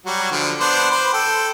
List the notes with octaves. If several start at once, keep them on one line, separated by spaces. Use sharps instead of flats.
F#3 G3 F#4
D3 F3
B3 D4 C5
B4 C5
A4 G5